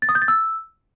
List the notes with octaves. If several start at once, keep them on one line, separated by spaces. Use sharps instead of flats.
A6
D#6
G6
A6
E6